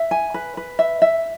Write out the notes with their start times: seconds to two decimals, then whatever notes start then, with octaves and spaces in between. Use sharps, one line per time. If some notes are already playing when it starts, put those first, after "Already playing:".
Already playing: E5
0.11 G#5
0.34 B4
0.57 B4
0.79 E5
1.02 E5